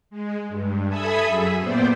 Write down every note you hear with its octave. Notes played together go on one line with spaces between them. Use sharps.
G#3
G2
A4 E5 G#5 B5 D#6 E6
F#2 G#4 E5
A#2 B3 C5 D5 G5